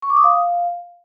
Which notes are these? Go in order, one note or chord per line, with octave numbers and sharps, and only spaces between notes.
C#6
D6
D#6
F5